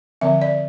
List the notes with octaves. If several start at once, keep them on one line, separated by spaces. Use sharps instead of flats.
D3 F3 C4 E5
D5